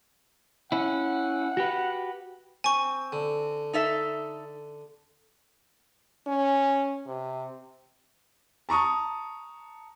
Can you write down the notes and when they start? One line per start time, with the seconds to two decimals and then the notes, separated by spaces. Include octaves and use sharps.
0.72 C#4 E4 F#5
1.57 F#4 G4 B4
2.64 C4 G#5 C#6
3.12 D3
3.73 D#4 A4 E5
6.27 C#4
7.07 C3
8.69 A5 A#5 C#6 D#6